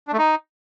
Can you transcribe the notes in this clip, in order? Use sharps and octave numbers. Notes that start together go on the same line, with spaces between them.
D4
A3
D#4